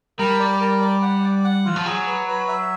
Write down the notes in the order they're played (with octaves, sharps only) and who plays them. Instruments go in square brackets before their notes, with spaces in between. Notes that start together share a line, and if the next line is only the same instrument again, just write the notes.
[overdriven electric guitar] G3 [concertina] A#4
[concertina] D5
A#4
D5
F#5
D5
F#5
[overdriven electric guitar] E3 [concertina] F4
[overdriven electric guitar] F3
[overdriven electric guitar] F#3 [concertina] G#4
[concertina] B4
B4
E5